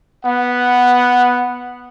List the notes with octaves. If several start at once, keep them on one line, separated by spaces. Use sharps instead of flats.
B3 F#5